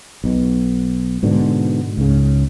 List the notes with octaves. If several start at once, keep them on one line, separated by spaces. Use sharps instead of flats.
B1 B2
G#2 B2 D3
C#2 G#2 C#3